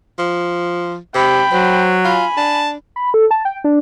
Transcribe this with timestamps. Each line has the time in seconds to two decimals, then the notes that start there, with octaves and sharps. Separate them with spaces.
0.19 F3
1.14 C3 G5 B5
1.52 F#3 C5
2.05 F4 G#5 B5
2.37 D4 A5
2.96 B5
3.14 A4
3.31 A5
3.45 G5
3.64 D4